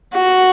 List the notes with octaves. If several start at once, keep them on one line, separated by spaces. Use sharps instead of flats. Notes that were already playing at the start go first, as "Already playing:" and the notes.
F#4